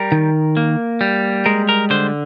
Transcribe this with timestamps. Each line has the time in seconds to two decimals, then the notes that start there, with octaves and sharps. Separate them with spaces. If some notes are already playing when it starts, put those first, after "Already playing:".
Already playing: G3 A#4
0.12 D#3
0.57 A#3
1.01 G3
1.46 G#3 A#4
1.69 A#4
1.90 D3 C5